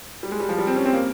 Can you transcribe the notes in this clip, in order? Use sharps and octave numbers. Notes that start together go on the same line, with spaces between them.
G3
G#3
G3
F3
G3
C4
C#4
C4
A#3